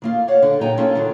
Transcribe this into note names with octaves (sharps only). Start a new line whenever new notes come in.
D#3 A#3 F4
C#5 D5 F5 F#5
D3
A#2 F#3 D#4 G#4 G5 A#5
A#3 C#4 F4 G#4 A4
D3 D#3 F#3